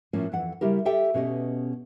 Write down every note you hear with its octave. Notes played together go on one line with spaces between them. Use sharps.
A2 F3 A#3 C#4
F2 E3 F#5
C#3 G3 E4 G4 A#4
G4 A4 E5 G5
B2 C#4 G4 D#5